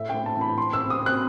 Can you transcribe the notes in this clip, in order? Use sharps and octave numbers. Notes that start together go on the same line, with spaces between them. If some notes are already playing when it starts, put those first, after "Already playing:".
Already playing: A2 E5
A3 G5
A5
E3 B5
C4 C6
E6
C4
D#6
C4
F#6